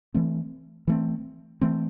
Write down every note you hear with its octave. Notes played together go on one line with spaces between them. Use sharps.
E3 A3 C4
E3 A3 C4
E3 A3 C4